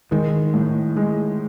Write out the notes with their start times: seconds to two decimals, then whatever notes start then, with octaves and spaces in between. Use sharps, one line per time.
0.11 D#3 G#3
0.54 A2
0.96 G#3